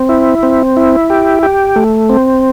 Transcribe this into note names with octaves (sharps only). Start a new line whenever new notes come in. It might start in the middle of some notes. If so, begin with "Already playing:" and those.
Already playing: C4
E4
C4
E4
G4
G4
A3
C4